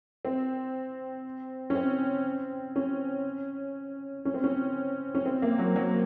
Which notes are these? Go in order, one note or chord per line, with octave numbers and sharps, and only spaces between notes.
C4
C#4
C4
C#4
C#4
C4
C#4
C#4
C4
A#3
F#3
F#3